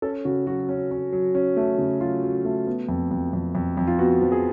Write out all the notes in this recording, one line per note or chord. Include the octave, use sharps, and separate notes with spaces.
C#4 A4
C#3 F#4
F#3 F#4
C#4
C#4
F#3
C#4
A3
C#3
F#3 F4
F#3
A3
B3
F2
F2
F2
F2
F2
F4
B3 F#4
F3
G#4